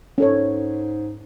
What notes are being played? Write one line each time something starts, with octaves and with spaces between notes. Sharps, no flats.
G#2 C#4 A4 C#5